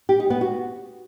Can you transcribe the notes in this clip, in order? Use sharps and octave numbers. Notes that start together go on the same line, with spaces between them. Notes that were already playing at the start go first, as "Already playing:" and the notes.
G4
D#4
B3
F#4